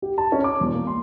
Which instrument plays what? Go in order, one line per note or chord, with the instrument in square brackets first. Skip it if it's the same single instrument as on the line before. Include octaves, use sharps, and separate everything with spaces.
[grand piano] G4
A5
C#4
D6
E1
A#3
C6